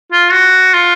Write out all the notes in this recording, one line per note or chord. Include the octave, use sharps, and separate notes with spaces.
F4
F#4
F4